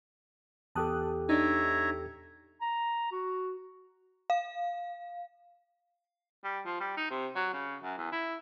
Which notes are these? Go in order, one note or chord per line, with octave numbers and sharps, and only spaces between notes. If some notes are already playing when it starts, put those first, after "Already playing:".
E2 G4 A4 A5 D#6 F#6
D4 D#4 C#5 E5 A#5
A#5
F#4
F5
G3
F3
G3
D#4
C3
F#3
C#3
F#2
E2
E4